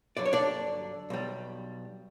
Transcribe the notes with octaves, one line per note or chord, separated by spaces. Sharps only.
G2 D3 F#3 D5
C#5
D4 D5
B1 B2 G3